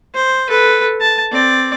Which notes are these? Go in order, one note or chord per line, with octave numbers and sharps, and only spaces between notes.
C5
A4 B4
A5
C4 D5